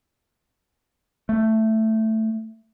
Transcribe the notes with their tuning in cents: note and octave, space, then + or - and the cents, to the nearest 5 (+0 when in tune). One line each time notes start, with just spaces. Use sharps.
A3 +5